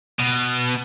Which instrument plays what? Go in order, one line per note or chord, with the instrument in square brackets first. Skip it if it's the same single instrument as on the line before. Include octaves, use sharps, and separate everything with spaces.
[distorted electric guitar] B2